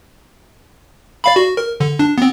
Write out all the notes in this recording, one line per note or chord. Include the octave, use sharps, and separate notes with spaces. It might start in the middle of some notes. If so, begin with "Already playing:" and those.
D5 F5 B5
F#4
A#4
D3
D4
B3 C4